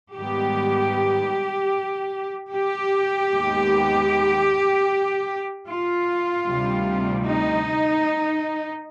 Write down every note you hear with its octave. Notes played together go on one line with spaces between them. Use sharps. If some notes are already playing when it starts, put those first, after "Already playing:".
G#2 D#3 G3 B3 G4
G4
D#2 D#3 G#3 B3
F4
D2 C3 D#3 G3
D#4